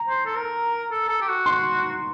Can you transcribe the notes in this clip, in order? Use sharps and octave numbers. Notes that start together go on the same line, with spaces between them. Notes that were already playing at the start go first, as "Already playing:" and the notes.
Already playing: A#5
C5
A4
A#4
A4
A4
G4
F#4
C6